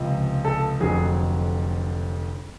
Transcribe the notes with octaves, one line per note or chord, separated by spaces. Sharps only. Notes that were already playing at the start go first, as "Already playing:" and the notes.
Already playing: C#2 C3 F3
A4
F1 F2 D3 F#3 G#4